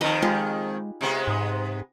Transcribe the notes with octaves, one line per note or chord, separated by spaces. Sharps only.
F2 D#3 D#4 B4 D#5
G#3 F4 G4 G#4
C3 G#3 B3
G#2